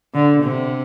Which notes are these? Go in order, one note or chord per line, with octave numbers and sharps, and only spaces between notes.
D3
C3